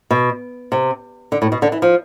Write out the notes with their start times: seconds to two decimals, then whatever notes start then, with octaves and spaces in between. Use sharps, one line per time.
0.11 B2
0.72 C3
1.32 D3
1.42 A2
1.52 B2
1.62 D3
1.72 E3
1.82 F3